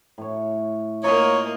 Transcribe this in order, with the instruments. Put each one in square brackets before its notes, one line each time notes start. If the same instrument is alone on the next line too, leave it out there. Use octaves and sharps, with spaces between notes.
[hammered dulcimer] A2 C#5
[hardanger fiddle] A#3 D#5 [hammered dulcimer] D#4 F4 [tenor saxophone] C#5